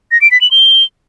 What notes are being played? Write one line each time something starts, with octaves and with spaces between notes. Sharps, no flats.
A#6
D7
B6
F#7
G7